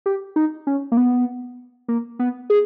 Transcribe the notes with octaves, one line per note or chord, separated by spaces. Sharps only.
G4
D#4
C#4
A#3
B3
A#3
B3
G#4